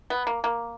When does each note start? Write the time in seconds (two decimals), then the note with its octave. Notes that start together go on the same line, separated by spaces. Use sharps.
0.10 B3
0.27 A#3
0.44 A#3